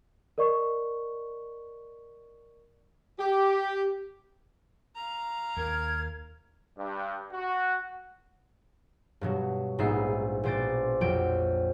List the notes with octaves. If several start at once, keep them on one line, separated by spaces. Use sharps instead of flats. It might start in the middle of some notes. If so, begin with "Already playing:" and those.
A#4 D5 D#5 C#6
G4
F5 A#5
D#2 A#4 G#6
G2
F#4
G2 B2 F#3
A#1 G#2 B3 D#4 E5 C7
A#1 B2 C5 D6 A6
F2 F#3 G5 D7